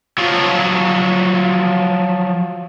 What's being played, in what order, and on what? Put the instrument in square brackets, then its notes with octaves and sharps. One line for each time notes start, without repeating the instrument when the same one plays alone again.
[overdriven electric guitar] F3 F#3